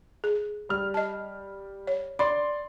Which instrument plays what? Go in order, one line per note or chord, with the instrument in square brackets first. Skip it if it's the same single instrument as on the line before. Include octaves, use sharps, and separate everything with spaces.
[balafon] G#4
[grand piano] G3 F6
[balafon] D#5 A5
C#5
[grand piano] D5 C6 [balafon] B5